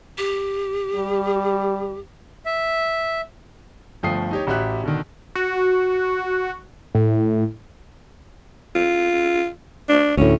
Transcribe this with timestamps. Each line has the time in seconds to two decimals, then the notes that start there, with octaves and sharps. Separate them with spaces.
0.18 G4
0.96 G3
2.46 E5
4.03 G1 F3 A3 G5 D#6 C7
4.31 D#4 G4 C#5
4.47 A1 F#4 G4 E5 F#6
4.83 B2 D3 D#3
5.35 F#4
6.95 A2
8.75 F4
9.89 D4
10.17 D2 A2 C#4